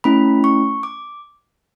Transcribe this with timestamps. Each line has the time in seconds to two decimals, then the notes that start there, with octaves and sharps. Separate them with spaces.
0.04 A3 C#4 E4 B5
0.44 C#6
0.83 D6